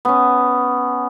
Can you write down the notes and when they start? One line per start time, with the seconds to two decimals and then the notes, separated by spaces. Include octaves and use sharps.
0.05 B3 C#4